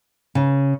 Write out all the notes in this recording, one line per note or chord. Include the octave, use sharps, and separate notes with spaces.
C#3